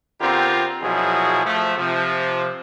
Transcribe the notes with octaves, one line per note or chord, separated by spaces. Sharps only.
D3 B3 C4 F4 G4 A#4
A#1 B2 F3 F#3 E4 G#4
F3 A3
C3 F3